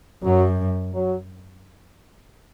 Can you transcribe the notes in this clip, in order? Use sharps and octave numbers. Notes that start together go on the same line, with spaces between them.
F#2 F#3
F#3